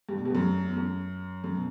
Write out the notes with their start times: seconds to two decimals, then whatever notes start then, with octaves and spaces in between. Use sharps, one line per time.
0.09 G2
0.18 B2
0.25 G2
0.30 E2
0.35 F#2
0.66 E2
0.77 F#2
1.44 F#2
1.55 B2